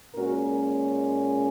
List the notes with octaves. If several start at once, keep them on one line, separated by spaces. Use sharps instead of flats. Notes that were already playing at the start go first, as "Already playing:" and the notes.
A#2 G#3 C#4 F#4 A#4